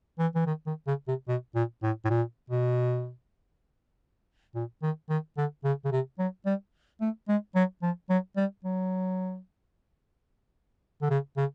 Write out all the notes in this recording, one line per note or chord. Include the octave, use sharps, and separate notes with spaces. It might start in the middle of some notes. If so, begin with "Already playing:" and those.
E3
E3
D#3
D#3
C#3
C3
B2
A#2
A2
A2
A#2
B2
A#2
D#3
D#3
D3
C#3
C#3
C3
F#3
G3
A3
G#3
F#3
F3
F#3
G3
F#3
D3
C#3
C#3